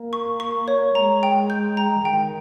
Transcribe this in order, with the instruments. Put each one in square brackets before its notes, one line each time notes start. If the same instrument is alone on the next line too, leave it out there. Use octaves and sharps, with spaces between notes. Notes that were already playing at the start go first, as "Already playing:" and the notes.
Already playing: [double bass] A#3
[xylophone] C#6
C#6
C#5
[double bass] G#3 [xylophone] A#5
[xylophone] G5
G6
A#5
[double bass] D#3 [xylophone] G5